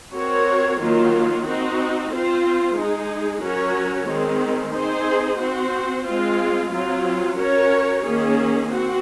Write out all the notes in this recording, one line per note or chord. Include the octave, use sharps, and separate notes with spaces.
C4 F#4 A#4 C#5
D#3 F#3 A#3 F4
C4 D#4 F#4
C4 F4 C5
G#3 D#4 G#4
F#3 C#4 F#4 A#4 C#5
D#3 G#3 C4
C4 D#4 G#4 C5
C4 F#4 C5
G#3 C4 F4
F#3 C4 F4
C#4 F#4 A#4 C#5
D#3 A#3 C#4 G#4
C4 F#4